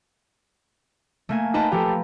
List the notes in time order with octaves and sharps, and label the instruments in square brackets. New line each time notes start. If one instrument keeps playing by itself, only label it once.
[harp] A3 A#3 G#5
[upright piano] D#4 A5 [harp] B4 G5 A#5
[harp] F3 [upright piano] G4 A4 A5